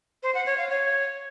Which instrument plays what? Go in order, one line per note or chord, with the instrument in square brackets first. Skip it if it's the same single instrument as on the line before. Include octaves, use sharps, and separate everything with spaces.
[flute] C5
F#5
C#5
F5
C#5